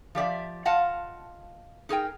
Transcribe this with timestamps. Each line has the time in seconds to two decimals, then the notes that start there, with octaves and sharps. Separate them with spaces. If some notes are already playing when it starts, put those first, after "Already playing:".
0.15 F3 G4 D5 E5
0.65 F4 D#5 F5 F#5 A5
1.89 D#4 G#4 A#4 G5